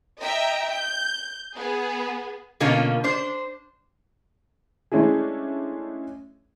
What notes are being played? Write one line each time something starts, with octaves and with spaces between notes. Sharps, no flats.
D#5 E5 G5 A#5
G6
B3 G#4
B2 D3 A#3 C#4 F4
D4 C5
G#3 A3 C#4 D4 E4 G#4